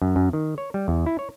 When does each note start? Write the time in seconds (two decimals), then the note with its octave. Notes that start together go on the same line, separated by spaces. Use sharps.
0.02 F#2
0.16 F#2
0.33 D#3
0.58 C#5
0.74 G3
0.88 E2
1.06 E4
1.19 C#5